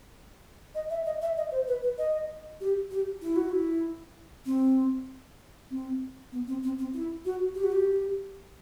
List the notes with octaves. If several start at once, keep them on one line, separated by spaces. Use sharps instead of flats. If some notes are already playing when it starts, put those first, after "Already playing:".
D#5
E5
D#5
E5
D#5
C5
B4
B4
D#5
G4
G4
E4
F#4
E4
C4
C4
B3
C4
C4
C4
E4
F#4
G4
F#4
G4